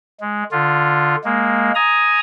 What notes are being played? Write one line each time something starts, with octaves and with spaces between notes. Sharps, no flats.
G#3
D3 F4
G#3 A#3
G#5 A#5 D#6